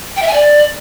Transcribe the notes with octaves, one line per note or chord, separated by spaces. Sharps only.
G5
E5
G#5
D5